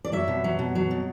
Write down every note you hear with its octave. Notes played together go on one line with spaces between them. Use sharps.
D5
F#3 E5
B2
F#3
B2
F#3
B2